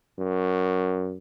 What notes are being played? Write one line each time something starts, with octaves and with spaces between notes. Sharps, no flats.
F#2